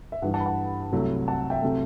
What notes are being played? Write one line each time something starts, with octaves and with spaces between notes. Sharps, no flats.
E5
G2 E3 G3 F#5
F#5 A5
B5
F#5 A5
C2 C3 F#3 A3
F#5 A5
E5 G5
C3 F#3 A3